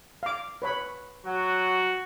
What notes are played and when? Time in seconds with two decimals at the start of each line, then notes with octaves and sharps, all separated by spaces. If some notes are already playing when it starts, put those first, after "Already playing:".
0.23 F5 D6
0.62 B4 C#5 B5
1.26 F#3 F#4